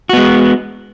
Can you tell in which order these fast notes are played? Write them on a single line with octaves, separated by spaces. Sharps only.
F#4 B3 G#3